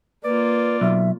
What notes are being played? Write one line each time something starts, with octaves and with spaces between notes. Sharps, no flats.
A#3 F4 B4 D5
B1 E5